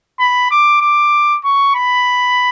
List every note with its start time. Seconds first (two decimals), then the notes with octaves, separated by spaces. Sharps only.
0.20 B5
0.51 D6
0.81 D6
1.44 C#6
1.75 B5